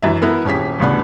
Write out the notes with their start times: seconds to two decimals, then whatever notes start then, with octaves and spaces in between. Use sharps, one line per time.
0.02 F#2 E3 E5
0.22 B3 E4 A4 A#4
0.45 D#1 C#4 G4 G#4 B6
0.80 A1 D2 C#3 B3 D4 B5